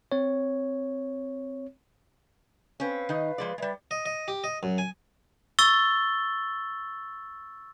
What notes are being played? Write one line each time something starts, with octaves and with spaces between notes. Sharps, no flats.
C4 C#5
C4 C#4 B4 F5
D#3 D#4 D#5
F3 G#3 D5
G3 G#3 B4 D5 E5
D#5
D#5
G4
D#5
F#2
G#5
C#6 E6 A6 G7